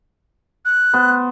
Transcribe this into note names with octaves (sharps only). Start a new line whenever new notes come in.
F#6
B3 C5